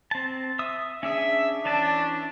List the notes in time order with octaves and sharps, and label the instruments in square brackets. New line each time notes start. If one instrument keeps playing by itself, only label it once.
[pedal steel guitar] C4 A5
E5 D#6 E6
[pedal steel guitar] C#4 D4 G#4 [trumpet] E5
[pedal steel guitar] E3 C#4 A5 [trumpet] D4